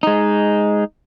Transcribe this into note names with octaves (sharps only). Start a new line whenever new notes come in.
G#3 D#4